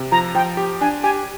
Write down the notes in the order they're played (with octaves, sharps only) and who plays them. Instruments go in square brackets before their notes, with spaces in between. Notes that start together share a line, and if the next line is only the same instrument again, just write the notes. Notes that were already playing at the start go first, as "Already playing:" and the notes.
Already playing: [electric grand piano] C3
[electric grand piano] F3 [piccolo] A#5
[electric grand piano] F3 [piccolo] G5
[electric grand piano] G4
[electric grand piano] D4 [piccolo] G#5
[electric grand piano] G4 [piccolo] G#5